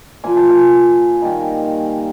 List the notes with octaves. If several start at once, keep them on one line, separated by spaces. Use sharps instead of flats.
A#2 F3 A#3 G#5
A5
G#5
D#3 G3 A#3 D#4